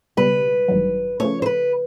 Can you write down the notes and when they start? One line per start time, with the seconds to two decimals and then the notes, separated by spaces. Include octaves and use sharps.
0.17 C#2 B2 G3 B4
0.68 A1 G2 D#3 F#3
1.20 C#3 F3 A3 C#5
1.42 C5
1.46 B4